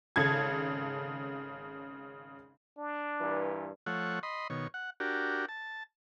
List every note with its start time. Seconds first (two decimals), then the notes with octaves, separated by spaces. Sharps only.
0.16 G#1 C#3 A4 G#6
2.78 D4
3.20 G2 A#2 E3
3.86 F3 A3 C#5 F#5
4.23 D#5 B5 C6
4.50 B2 D#3 C#5
4.74 F#5
5.00 D4 F#4 G4 A#4
5.49 A5